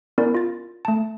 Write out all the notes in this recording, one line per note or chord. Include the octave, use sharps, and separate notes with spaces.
B3 C#4 E4 A#4 D5
F4 A6
A3 A5